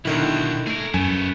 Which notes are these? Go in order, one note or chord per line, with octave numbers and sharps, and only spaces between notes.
B1 B2 D3 D#3 E4
A3 G#4 A#4
F#2 A3 B3 G#5